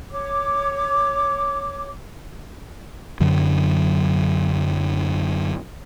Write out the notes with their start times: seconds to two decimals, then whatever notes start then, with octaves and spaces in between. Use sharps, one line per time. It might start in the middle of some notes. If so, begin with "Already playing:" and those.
0.11 C#5 D6
3.20 F#2 D3 F#3